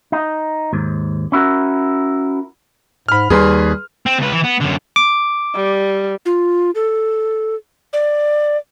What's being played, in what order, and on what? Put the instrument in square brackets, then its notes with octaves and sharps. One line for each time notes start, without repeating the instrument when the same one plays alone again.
[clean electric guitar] D#4
D#2 G#2
C#4 E4 F#4 A#4
[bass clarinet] G#2 [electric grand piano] B5 F6
[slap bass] D#2 [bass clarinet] G3 [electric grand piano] G#4 B4 C6
[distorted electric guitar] C4
C#2 B4
E3
B3
F#2 D3
[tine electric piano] D6
[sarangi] G3
[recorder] F4
A4
D5